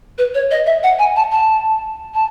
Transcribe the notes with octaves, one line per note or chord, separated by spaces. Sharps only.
B4
C#5
D#5
E5
F#5
G#5
A5
A5
A5